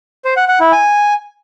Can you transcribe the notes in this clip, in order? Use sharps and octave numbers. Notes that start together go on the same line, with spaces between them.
C5
F#5
F#5
E4
G#5